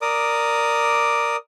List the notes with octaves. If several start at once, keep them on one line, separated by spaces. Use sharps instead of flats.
A#4 D5 D6 D#6